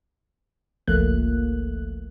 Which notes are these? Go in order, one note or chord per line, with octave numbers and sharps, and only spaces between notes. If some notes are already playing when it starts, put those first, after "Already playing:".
G1 C#2 F3 A3 A#3 F#6